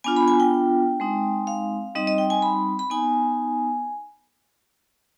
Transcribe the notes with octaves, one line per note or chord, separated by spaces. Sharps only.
B3 D4 F4 G#5
B5
G#5
G5
G#3 C4 D#4
F5
G3 C4 D#4 D#5
D#5
G5
G#5
B5
B5
B3 D#4 G#5